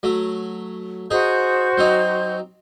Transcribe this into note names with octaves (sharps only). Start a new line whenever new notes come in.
F#3 A3
D#4 F#4 G#4 C5 G6
F#3 C4 D#4